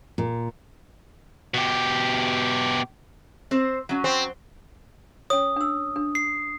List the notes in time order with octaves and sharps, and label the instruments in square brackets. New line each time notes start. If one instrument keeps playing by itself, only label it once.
[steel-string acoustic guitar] A#2
[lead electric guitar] B2 G4
[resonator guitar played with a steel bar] C4 C5
F#3 C#4
[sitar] C4
[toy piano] C#4 C#5 [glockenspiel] D#6
[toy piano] D4 E6
D4
[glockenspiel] C7